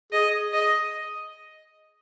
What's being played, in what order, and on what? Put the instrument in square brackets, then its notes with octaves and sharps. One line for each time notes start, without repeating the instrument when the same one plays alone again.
[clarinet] G#4 [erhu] D#5
[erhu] D#5